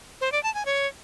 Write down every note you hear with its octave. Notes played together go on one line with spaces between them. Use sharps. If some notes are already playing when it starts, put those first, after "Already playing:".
C5
D5
A5
G#5
C#5